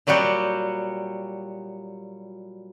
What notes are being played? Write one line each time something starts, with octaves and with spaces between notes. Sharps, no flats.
A#2 F#3 G3 F#4 G4